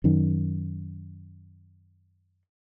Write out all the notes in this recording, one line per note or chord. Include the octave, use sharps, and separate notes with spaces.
F#2 D#3